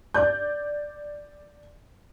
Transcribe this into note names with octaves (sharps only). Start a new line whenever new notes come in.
D5 G6